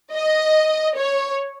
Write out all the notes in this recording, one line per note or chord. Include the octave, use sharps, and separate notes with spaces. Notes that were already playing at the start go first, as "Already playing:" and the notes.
D#5
C#5